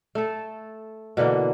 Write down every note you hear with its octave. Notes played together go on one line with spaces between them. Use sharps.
A3 A4
B2 D3 E3 A#3